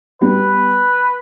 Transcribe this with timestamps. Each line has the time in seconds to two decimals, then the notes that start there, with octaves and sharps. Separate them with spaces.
0.21 G3 B3 B4